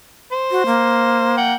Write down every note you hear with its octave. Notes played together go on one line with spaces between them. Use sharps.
C5
F#4
A#3
F#5 G5